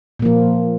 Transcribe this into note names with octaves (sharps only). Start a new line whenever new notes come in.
A#2 F3 A#3